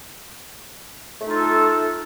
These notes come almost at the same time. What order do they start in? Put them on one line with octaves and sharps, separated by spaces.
A3 D#4 F4 A4